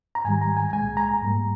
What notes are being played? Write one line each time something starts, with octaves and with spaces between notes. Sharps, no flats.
A#5
G#2 D#3 G3 G#5
A#5
G#5
C2 A#2 G#3 G#5
A#5
G#2 G3 A#3